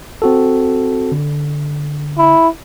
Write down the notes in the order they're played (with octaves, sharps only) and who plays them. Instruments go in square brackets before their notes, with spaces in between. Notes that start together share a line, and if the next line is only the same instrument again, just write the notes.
[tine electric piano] C4 F#4 A4
D3
[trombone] E4